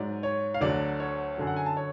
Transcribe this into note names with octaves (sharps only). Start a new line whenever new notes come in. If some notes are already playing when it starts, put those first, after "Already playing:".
Already playing: G#2 F#3 D5
C#5
F5
D2 D3 F#3 D5
C#5
F#2 D3 F#3 G#5
F#5
G#5
A5
C#5